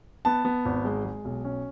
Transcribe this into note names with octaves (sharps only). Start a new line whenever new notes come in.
B3 A5
B3
G#1
G#3
G#3
B1
C#4